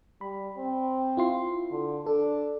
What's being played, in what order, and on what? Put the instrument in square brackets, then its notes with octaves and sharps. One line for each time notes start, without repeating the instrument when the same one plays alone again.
[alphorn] G3 [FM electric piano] B5
[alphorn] C4
[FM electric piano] E4 F4 C6
[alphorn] D3
[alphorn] D4 [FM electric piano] A4